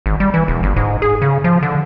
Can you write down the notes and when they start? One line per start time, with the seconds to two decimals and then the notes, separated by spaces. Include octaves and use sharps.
0.06 G#1
0.20 G3
0.34 E3
0.48 E1
0.63 G1
0.76 G#2
1.02 G#4
1.22 C#3
1.44 F3
1.63 D3